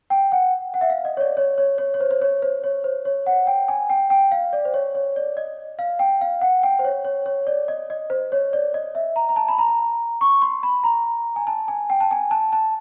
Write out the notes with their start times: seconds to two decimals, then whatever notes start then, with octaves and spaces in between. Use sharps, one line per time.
0.10 G5
0.32 F#5
0.74 F#5
0.81 E5
0.90 F5
1.05 D#5
1.17 C#5
1.21 D5
1.37 C#5
1.58 C#5
1.78 C#5
1.94 C#5
2.00 C5
2.11 C5
2.21 C#5
2.42 C5
2.64 C#5
2.84 C5
3.05 C#5
3.26 F#5
3.47 G5
3.68 G#5
3.90 G5
4.10 G5
4.32 F5
4.53 D5
4.65 C5
4.74 C#5
4.95 C#5
5.16 D5
5.37 D#5
5.79 F5
5.99 G5
6.21 F5
6.41 F#5
6.63 G5
6.79 C5
6.84 C#5
7.05 C#5
7.26 C#5
7.47 D5
7.68 D#5
7.90 D#5
8.10 C5
8.32 C#5
8.53 D5
8.74 D#5
8.95 E5
9.16 A#5
9.29 A#5
9.36 A5
9.48 B5
9.58 A#5
10.21 C#6
10.42 C6
10.63 B5
10.84 A#5
11.36 G#5
11.47 A5
11.68 G#5
11.90 G5
12.00 A5
12.11 G#5
12.31 A5
12.52 A5